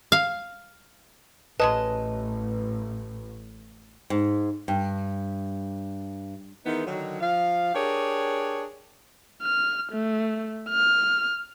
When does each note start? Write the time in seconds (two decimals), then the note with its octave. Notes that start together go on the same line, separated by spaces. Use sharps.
0.12 F5
1.60 A1 G#3 C#4 B4 D#5 A5
4.10 G#2
4.68 G2
6.66 D#3 E3 G#3 B3 D#4
6.87 D3 D#3 F#3
7.21 F3 F5
7.75 D4 G4 G#4 A#4 C#5
9.42 F6
9.92 A3
10.70 F6